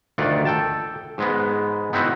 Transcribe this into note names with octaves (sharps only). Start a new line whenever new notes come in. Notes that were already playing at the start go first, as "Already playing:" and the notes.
D2 D#3 F4 D5 F#5
A4 G5 A5
G#2 G#3 B3
B3 C4 D#4 E4 F#4 C5